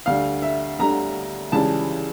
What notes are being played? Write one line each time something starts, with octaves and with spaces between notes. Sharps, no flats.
D2 D3 G3 F5
E5
D2 D3 G3 A#5
C#2 C#3 E3 G3 A5